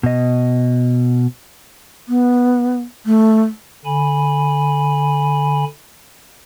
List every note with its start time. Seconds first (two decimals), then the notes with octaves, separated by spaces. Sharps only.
0.03 B2 D#5
2.09 B3
3.06 A3
3.85 D3 G#5 B5